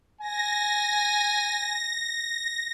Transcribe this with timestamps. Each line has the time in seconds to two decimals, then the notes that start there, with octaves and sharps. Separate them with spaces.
0.21 G#5 A#6